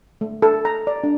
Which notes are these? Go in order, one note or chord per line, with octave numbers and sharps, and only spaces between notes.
A3
A4
A#5
D5
D4